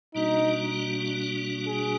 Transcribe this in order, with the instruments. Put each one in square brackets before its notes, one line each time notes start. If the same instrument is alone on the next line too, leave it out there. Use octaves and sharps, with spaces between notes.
[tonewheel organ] B2 G3 A#3 D4 F#4 [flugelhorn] D#4
[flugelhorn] G#4